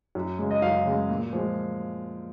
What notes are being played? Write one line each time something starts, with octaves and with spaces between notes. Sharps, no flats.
F#2
C#3 G#3
D#5
F#2 F5
C#3 G#3
A#2
F3 G#3